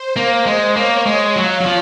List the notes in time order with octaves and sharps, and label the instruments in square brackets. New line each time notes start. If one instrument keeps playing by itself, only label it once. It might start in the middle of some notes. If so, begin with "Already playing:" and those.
Already playing: [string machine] C5
[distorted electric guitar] A#3 [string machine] C5
[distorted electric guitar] G#3
[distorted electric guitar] A#3 [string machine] C#5
[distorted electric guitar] G#3
[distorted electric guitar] F#3 [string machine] F5
[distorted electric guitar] F#3
F3